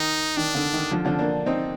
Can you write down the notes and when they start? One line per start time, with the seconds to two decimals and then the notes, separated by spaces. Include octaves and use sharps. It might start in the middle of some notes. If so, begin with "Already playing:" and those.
Already playing: D#3 D#4
0.37 D#3 D4
0.55 D3
0.73 D#3
0.91 D3 F3
1.05 D3 F3
1.19 A#3 D4
1.46 C4 D#4